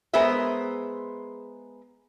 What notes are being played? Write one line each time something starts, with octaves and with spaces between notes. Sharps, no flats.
G#3 B3 G#4 A#4 C5 E5